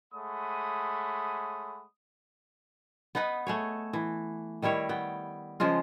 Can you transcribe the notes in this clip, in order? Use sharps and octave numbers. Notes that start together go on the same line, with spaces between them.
G#3 A3 C#5 F#5 B5 D#6
B3 D#4 B4 F#5
A3 G#4 C#5
E3
D#3 G3 E4 C#5
B3 G5
C#3 F3 G#3 F4